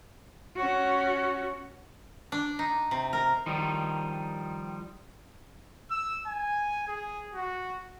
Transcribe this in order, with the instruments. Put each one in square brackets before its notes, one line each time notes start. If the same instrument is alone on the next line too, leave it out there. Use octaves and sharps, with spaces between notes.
[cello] C#4 F#4
[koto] D4
D#4
C3
A#4
[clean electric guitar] D#3 F3 G3 D#4
[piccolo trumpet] E6
G#5
G#4
F#4